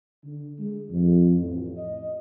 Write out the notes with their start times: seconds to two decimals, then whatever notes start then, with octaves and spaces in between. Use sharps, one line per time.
0.24 D3
0.59 G#3
0.89 F2
1.38 A1
1.77 D#5